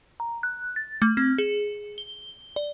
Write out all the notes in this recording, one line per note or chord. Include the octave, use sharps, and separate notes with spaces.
A#5
F#6
A6
A3
C4
G#4
G7
D5